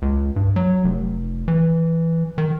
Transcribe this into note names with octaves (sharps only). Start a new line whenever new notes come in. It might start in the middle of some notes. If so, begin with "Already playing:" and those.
C#2
G2
F#3
F1
E3
D#3